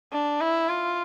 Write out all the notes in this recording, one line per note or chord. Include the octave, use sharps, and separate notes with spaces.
D4
E4
F4